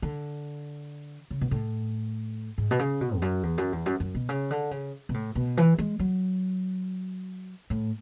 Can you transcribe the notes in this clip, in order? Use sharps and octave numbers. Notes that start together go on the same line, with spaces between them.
D3
C#3
B2
A2
G#2
B2
C#3
B2
E2
F#2
E2
F#2
E2
F#2
F#2
B2
C#3
D3
C#3
B2
A2
B2
E3
G#3
F#3
A2